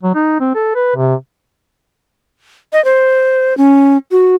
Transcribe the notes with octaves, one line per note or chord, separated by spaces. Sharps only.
F#3
D#4
C4
A4
B4
C3
D#5
C5
C#4
F#4